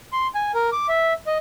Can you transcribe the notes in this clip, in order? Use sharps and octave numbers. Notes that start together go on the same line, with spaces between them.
C6
G#5
A#4
D6
E5
D#5